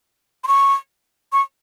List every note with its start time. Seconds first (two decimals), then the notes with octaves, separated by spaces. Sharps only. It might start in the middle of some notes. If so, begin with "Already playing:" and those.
0.44 C6
0.48 C#6
1.33 C#6